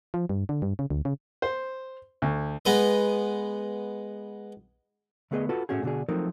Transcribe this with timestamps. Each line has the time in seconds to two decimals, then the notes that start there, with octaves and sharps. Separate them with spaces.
0.14 F3
0.29 G2
0.49 D3
0.62 G2
0.79 C#3
0.90 D2
1.05 C#3
1.42 C5
2.22 D2
2.65 G#3 B3 D#5
5.31 D3 A3 B3 G#4 B4 D#5
5.49 F4 F#4 A4 B4
5.69 A2 A3 C#4 F#4 G#4
5.83 B2 D3 D4 F#4 G#4
6.09 F3 F#3 A3 C4 D#4 A#4